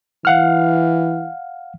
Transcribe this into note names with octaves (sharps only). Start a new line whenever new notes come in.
E3 F5 F#5 F6